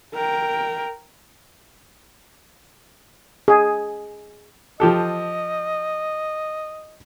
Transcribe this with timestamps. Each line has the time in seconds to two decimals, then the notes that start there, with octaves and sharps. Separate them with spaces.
0.14 A#4 G5
3.48 G#4
4.80 F3 G4 A4 D#5